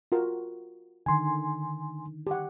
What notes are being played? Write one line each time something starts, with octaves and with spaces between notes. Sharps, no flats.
F4 F#4 A#4
D3 D#3 G#5 C6
G4 F#5